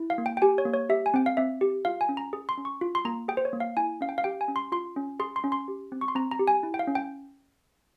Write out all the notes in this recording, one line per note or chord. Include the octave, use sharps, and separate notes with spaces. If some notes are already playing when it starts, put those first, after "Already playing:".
Already playing: E4
F5
A#3
G5
G5
G4 G#5
C#5
A#3
C#5
G4 E5
G#5
C4 G5
F5
C4 E5
G4
F4 F5
G#5
C#4
A#5
G#4
C6
C#4
C#6
F4
C6
A#3 A#5
G#4 G5
C5
C#5
A#3
F5
E4 G#5
C#4 F5
G5
F5
G4 G5
G#5
C#4
C6
F4 C6
C#4
G#4 C6
C6
C#4
C6
G4
C4
C#6
C6
C4 A#5
A#5
G4
G#5
E4
G5
F5
C#4
G5